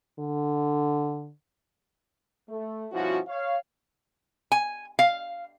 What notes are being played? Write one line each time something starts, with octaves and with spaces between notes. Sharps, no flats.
D3
A3
G2 B2 F3 C#4 E4 F#4
C#5 F5
G#5
F5